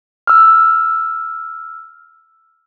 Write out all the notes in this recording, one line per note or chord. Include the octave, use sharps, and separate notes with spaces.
E6 F6